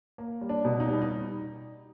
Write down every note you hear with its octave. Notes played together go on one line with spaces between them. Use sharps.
A#3
G3
D4
B2
D#4
G3
D#4